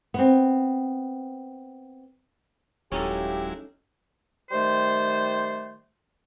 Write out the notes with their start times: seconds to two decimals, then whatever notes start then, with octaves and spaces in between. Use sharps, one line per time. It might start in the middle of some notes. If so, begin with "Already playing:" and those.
0.14 B3 C4
2.92 D#1 F#3 G#3 C#4 D#4 E4 G4 A4
4.51 D#3 G3 A3 C5